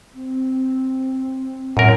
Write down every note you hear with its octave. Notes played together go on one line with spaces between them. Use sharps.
C4
F#2 A2 A#4